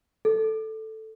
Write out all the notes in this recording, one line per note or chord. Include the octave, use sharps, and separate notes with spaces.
A4